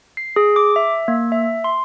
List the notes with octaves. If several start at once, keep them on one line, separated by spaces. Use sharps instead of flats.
C7
G#4
D6
E5
A#3
E5
C6